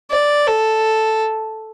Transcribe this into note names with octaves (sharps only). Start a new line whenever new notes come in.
D5
A4